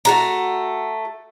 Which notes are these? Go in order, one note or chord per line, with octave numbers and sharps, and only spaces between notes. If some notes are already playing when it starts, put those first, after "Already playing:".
A3 F#4 A#5